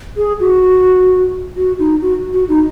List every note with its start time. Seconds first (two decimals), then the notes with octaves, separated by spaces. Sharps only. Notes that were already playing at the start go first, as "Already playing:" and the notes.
0.17 G#4
0.40 F#4
1.56 F#4
1.79 D#4
2.02 F#4
2.33 F#4
2.49 D#4